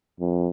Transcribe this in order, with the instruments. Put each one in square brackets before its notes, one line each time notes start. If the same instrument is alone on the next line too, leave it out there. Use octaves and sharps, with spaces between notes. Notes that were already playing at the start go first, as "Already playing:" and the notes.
[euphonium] F2